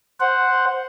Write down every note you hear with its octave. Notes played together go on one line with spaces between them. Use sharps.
C5 F#5